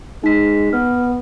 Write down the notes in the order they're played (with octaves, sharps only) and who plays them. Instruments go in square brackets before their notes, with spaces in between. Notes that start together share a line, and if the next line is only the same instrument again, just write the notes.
[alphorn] G#3 [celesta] D#4 B6
[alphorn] B3 [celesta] F6